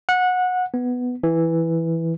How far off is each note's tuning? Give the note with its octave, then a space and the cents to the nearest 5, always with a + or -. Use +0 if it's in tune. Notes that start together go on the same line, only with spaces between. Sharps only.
F#5 -20
B3 +5
E3 +0